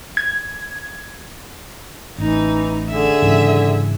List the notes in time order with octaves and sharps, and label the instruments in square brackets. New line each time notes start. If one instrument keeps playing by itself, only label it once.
[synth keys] G#6
[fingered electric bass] A1 [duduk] E3 [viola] D#4
[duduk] D3 [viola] G#4 E5
[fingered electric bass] G#2 C#3 E3